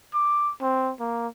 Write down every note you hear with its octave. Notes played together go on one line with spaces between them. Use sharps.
D6
C4
A#3